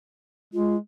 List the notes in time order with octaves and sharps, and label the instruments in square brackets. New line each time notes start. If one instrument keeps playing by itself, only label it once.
[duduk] G#3 [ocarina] F4